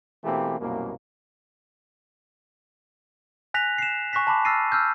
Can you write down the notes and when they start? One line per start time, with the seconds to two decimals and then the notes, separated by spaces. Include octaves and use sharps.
0.24 B2 E3 A3 A#3 C4 G4
0.59 C2 F#2 B2 A#3
3.54 G#5 F#6 A#6 B6 F7
3.78 C7 E7
4.13 G#5 C#6 F#6 A#6 B6
4.27 A5 B5 D6
4.45 E6 F6 A6 A#6 C7 D#7
4.72 E6 F6 G6